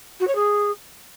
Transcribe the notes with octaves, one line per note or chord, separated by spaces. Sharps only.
F#4
C#5
G#4